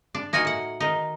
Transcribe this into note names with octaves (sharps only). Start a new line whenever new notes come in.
D4
A#3 D#4 F#4 G#5
A2 F#5
D#3 D#4